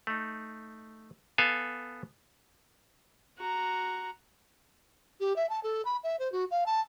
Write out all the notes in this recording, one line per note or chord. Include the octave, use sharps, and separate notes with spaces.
A3 D#4
B3 A4 F5 G#5
F#4 A#5
G4
E5
A5
A4
B5
E5
C5
F#4
F5
A5